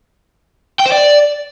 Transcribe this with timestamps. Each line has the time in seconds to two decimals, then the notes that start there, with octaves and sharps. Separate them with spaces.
0.79 G5
0.85 C5
0.91 D5